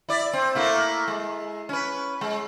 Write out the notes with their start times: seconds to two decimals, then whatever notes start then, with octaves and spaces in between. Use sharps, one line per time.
0.09 E4 D5
0.33 C4
0.55 A3 A#3 E4
1.08 G#3
1.69 C#4 B4
2.21 G#3